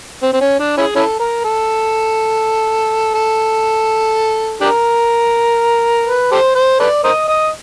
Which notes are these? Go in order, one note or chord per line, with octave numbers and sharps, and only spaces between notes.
C4
C4
C#4
D4
C#4 E4 G#4
C#4 E4 A4
A#4
A4
A4
D4 G4 A#4
B4
G4 A4 C5
C5
A4 B4 D5
A#4 C5 D#5
D#5